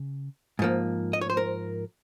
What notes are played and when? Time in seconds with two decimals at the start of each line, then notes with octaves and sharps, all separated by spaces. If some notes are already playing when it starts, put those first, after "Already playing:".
Already playing: C#3
0.59 G#2 F3 A#3
1.13 D#5
1.21 C#5
1.30 C5
1.37 A#4